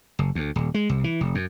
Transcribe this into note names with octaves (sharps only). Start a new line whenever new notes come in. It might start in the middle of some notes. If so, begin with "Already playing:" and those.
F#1
D2
D#1
G#3
C2
E3
F1
F#2